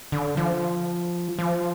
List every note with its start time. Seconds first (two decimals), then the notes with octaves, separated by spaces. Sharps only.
0.12 D3
0.37 F3
1.39 F3